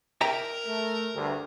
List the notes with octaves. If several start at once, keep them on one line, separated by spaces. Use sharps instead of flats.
A#4 E5 G5 A#5
A3
D2 G2